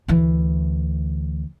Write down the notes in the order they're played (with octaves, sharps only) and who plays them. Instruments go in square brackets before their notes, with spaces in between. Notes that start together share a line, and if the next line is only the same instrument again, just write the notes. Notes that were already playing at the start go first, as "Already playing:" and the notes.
[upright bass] D2 E3